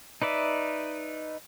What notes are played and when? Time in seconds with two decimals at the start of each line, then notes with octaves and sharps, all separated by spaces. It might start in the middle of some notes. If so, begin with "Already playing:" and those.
0.22 D#4 B4 D5 E5